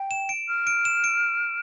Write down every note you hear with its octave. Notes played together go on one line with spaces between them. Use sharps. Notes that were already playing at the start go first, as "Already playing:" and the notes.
Already playing: G5
E7
D7
F6
D7
E7
D7